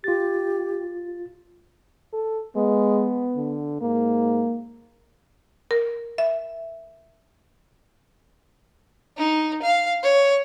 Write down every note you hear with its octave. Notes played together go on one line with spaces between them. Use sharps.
F4 G4 A6
A4
G#3 B3
D3
G#2 A#3
A#4
E5
D#4
F5
C#5